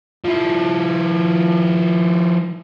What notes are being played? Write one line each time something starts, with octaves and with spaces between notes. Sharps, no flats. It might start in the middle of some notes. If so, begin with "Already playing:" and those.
F3 E4